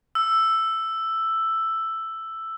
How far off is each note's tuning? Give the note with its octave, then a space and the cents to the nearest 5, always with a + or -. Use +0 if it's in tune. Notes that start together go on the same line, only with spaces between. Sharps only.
E6 +5